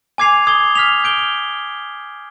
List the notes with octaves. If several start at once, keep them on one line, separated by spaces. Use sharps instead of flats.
G#5 D6 G#6 C7 F7
D#6 G#6 C7 G7
F6 B6 F7
G6 D7 G7